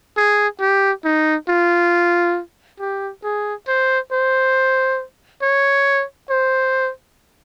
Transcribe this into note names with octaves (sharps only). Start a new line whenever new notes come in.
G#4
G4
D#4
F4
G4
G#4
C5
C5
C#5
C5